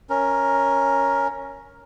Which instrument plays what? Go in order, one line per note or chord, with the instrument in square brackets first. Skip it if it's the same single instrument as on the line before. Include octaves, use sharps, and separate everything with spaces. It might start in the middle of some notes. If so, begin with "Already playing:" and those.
[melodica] C#4 A#4